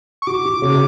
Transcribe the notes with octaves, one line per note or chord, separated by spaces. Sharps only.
C#6
F#4 D6
F#4
C#3